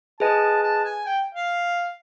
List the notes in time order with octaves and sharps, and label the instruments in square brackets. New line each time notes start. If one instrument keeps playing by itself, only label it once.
[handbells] G#4 B4 D#5 G#5 [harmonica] A5
[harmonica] A5
G#5
G5
F5